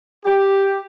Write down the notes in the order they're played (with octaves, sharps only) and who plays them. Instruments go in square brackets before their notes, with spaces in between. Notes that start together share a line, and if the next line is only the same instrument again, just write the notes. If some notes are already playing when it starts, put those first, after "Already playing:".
[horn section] G4